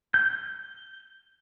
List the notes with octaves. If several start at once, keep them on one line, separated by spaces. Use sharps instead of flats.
G6